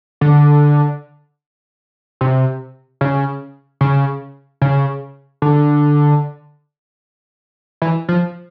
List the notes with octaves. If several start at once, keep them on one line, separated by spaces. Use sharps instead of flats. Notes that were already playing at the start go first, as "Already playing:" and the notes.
D3
C3
C#3
C#3
C#3
D3
E3
F3